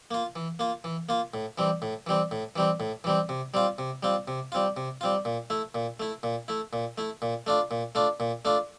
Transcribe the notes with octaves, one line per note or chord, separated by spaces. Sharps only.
A#3 F4
E3
A#3 F4
E3
A#3 F4
A2
E3 G3 C4
A2
E3 G3 C4
A2
E3 G3 C4
A2
E3 G3 C4
C3
G3 C4 F4
C3
G3 C4 F4
C3
G3 C4 F4
C3
G3 C4 F4
A#2
A3 E4
A#2
A3 E4
A#2
A3 E4
A#2
A3 E4
A#2
A3 D4 F4
A#2
A3 D4 F4
A#2
A3 D4 F4